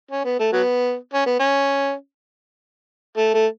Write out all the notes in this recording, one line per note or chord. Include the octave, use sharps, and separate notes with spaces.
C#4
B3
A3
F#3 B3
C#4
B3
C#4
A3
A3